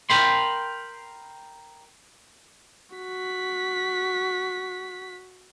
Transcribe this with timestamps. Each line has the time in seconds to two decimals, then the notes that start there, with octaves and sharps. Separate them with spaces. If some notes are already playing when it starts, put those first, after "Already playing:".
0.10 A#4 G5 B5 C6
2.96 F#4 B6